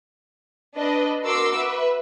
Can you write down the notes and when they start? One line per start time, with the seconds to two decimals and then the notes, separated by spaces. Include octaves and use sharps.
0.77 D4 B4 D#5
1.23 F#4 A#4 C6 D6 E6
1.57 B4 E5